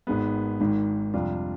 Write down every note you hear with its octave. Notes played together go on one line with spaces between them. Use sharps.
G#1 G#2 D#3 G#3 B3
G#1 G#2 D#3
F2 C3 G3 D4 F4